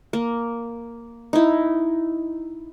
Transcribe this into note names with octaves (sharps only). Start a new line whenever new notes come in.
A#3
D#4 E4